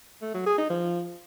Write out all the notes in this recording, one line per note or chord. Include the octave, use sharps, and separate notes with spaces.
A3
F#3
G#4
D#4
F3